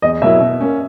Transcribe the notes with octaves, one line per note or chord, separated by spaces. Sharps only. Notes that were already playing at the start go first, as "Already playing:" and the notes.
E2 D#5
B2 F#3 A#3 E4 E5
B2
A#3 C#4